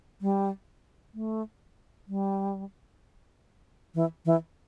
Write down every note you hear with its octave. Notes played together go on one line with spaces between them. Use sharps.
G3
A3
G3
E3
E3